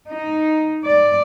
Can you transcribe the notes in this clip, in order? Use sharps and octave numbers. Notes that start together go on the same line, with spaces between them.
D#4
D5